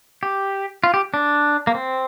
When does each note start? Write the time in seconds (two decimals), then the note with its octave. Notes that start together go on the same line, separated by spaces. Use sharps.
0.23 G4
0.84 F4
0.94 G4
1.14 D4
1.67 A#3
1.75 C4